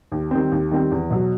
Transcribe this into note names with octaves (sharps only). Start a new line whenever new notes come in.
D#2
D#3 G3 C4
D#2
D#3 G3 C4
E2
B2 F#3